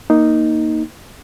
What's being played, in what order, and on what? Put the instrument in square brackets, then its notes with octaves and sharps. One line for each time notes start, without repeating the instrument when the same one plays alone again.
[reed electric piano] A#3 D#4